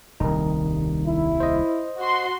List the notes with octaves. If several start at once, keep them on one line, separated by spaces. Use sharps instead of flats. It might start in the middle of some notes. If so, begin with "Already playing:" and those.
D#1 C2 D#3 D#4
E4
C5 D#5
F#4 C6